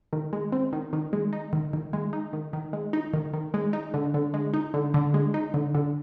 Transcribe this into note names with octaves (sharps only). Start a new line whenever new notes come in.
D#3
G#3
C4
D#3
D#3
G#3
D#4
D#3
D#3
G#3
D#4
D#3
D#3
G#3
D#4
D#3
D#3
G#3
D#4
D3
D3
G#3
D#4
D3
D3
G#3
D#4
D3
D3